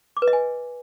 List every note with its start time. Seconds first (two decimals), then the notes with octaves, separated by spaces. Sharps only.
0.17 D6
0.22 B4
0.28 D#5
0.33 G#5